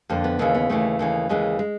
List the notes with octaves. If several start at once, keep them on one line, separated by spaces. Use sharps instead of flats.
F2 D3 A#3
B3
D#2 C#3 E3 A#3
B3
D#2 C#3 E3 A3
D#2 C#3 E3
D#2 C#3 E3 G#3
G#3